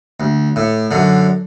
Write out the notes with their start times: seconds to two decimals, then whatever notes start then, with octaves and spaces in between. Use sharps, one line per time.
0.20 D2
0.56 A2
0.91 F#2 D3